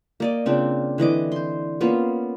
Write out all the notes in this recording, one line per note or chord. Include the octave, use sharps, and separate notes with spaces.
A#3 D5 D#5
C#3 C4 D4 F4
D3 E3 D#5 D6
C5 C6
A#3 B3 C#4 F4